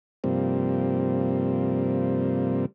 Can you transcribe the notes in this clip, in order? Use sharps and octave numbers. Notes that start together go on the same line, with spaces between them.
G2 C3 F3 G3 A#3 C4